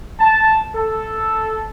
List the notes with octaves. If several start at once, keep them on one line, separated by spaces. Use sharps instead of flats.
A5
A4